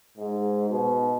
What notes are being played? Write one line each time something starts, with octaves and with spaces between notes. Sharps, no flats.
G#2
B2